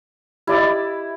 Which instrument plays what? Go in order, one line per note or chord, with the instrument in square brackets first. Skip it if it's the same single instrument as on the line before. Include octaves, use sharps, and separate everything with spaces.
[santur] E4 [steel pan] G4 D5 D#5